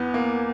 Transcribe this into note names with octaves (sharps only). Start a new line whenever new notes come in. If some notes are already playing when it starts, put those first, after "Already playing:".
Already playing: E2 B3
A#3